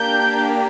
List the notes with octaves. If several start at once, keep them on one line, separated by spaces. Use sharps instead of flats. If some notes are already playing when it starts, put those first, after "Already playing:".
Already playing: A#3 D4 G4 G6